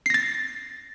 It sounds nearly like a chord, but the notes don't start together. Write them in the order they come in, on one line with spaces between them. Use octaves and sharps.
C7 A#6 A6